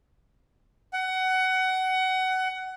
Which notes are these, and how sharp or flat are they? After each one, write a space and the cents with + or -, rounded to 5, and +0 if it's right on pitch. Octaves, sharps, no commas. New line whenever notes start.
F#5 +20